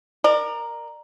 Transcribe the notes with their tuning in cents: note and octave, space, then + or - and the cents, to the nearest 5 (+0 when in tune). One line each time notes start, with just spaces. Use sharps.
A#4 +0 D5 +30